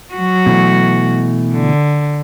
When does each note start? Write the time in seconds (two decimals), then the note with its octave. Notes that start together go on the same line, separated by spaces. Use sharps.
0.13 F#3 F#4
0.46 B2 E3 A3
1.53 D3